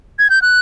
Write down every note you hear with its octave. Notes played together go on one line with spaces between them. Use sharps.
G#6
G6
F#6